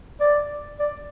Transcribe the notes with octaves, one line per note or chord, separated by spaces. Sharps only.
D5
D5